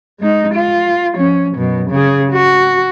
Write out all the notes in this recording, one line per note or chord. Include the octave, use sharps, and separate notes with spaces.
G#3 D#4
F4
F3 C#4
F#2 B2
C#3 G#4
F#4